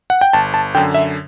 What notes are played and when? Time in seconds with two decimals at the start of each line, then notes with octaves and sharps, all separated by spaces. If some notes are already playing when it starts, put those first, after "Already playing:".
0.10 F#5
0.21 G5
0.33 G1 A5
0.54 A5
0.75 F#2 D3 G5
0.94 E5